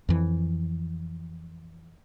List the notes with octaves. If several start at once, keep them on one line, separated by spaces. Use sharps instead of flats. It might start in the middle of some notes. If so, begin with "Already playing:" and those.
F2 E3